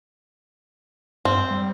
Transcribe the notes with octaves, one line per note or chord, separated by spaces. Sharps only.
G2 C4
G3